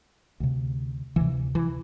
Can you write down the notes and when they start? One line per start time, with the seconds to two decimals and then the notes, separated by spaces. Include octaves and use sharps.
0.40 D2 C3
1.16 D2 C3 E3
1.55 E3